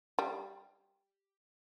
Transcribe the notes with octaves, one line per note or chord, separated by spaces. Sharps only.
G3